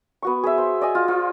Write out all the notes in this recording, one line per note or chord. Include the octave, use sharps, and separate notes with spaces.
B3 F#4 C#6
G#4 B4 E5
C5
D5 D#5 G#5
F4
F4 C5